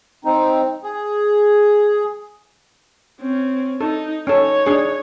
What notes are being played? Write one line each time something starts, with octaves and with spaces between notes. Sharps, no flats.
C4 D#4
G#4
C4 C#4
D#4 A4
C#4 D#4 A4 C#5
D4 G#4